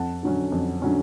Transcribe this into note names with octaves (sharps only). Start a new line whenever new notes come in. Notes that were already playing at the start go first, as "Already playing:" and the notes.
Already playing: F2 F#5 A5
D3 F#3 C#4
F2
D3 F#3 C#4